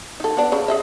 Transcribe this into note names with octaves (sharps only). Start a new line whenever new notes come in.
D#4 A4
B3 D4
C#3
G#4 D#5 E5